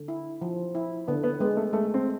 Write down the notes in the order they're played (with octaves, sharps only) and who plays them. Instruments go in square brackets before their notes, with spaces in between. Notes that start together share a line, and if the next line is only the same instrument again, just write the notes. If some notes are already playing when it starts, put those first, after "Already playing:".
Already playing: [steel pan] D3
E4
F3
E4
[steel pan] D3 [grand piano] B3
[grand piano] B3
[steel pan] G#3 [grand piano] B3
[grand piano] A3
[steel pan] G#3 [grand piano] A3
[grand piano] C4